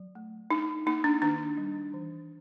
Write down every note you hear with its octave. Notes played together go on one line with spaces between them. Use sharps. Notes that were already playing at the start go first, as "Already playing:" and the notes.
Already playing: F#3
A3
D4 D#4
A#3 D#4
D4
D#3 D4
G3
E3